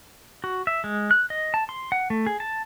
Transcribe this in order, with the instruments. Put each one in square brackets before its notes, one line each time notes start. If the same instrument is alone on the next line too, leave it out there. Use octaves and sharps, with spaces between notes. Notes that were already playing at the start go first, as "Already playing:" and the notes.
[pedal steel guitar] F#4
E5
G#3
F#6
D#5
A5
C6
F#5
A3
G#4
A5